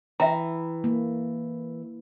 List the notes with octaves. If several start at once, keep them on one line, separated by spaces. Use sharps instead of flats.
E3 E5 G5 A#5
A#3